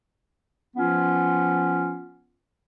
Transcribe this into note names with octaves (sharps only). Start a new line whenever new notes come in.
F3 B3 C#4 F4